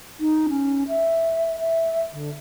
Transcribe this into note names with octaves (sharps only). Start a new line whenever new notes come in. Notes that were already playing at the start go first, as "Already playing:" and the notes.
D#4
C#4
E5
E5
D3